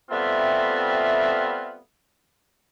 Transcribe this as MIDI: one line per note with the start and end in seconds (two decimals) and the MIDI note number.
0.10 1.79 55
0.10 1.79 57
0.10 1.79 59
0.10 1.79 60
0.10 1.79 65
0.10 1.79 76